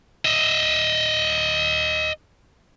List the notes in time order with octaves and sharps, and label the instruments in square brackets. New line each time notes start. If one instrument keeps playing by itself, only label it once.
[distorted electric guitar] D#5 E5